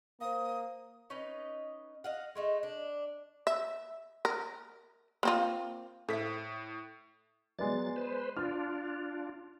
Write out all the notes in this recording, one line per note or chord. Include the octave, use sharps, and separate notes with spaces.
A#3 C5 F5 D#6
C#4 D#4 B4 D#5
D#5 F5 F#5
G#3 A3 D#4
D4
E5
A#4
A#3 C4 F4
A2 A4 C5 E5 B6
F#3 G#3 B3 D5 A6
B4 C5
D4 F4 F6